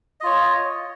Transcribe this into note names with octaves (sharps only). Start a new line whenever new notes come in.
F4 C#5 D#5